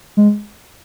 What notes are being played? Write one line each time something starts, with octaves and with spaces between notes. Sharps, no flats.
G#3